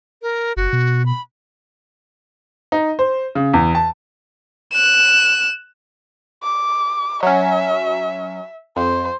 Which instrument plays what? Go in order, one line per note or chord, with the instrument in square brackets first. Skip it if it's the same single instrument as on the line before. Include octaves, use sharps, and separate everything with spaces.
[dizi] A#4
[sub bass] F#1 [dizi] F#4
[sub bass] B2
[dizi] B5
[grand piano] D#4
C5
C#3
E2
A5
[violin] F#6 E7
[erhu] D6
[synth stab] F#3 C#4 [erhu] E5
[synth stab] F2 [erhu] C5